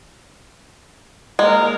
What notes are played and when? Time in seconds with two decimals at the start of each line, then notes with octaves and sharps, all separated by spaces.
1.39 G#3 A#3 A#4